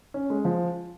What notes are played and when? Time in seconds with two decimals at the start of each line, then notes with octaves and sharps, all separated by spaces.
0.14 C#4
0.30 G#3
0.45 F3